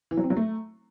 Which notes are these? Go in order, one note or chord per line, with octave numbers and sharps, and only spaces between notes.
E3
F#3
C4
F#3
A3